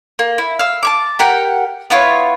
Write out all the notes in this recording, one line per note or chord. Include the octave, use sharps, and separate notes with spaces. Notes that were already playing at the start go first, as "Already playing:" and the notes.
A#3
E4
F5 E6
A5 C#6 D6
G4 A#4 F#5 G5
B3 E4 F4 C#5